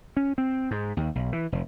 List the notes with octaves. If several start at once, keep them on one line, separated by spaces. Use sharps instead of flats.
C#4
C4
G#2
D#2
B1
E3
F1